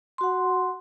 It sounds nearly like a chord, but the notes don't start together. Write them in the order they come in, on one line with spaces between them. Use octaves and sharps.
C6 F#4 F#5